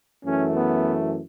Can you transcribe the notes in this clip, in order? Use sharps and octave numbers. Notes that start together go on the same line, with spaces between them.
F#2 E3 A3 C#4
B3